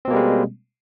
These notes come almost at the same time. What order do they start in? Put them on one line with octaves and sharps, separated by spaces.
C4 B2 A#3 G3 G#3